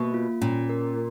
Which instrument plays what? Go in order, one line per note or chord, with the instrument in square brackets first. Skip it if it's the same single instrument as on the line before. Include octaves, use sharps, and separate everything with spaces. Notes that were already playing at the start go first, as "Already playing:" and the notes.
Already playing: [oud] B2 [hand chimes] A#3
[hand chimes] F4
[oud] A#2 [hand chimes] C#4
[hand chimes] A#4